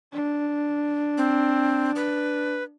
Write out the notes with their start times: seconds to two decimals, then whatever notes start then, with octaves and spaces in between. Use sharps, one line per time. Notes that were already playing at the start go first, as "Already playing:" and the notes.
0.13 D4
1.18 C4
1.96 B4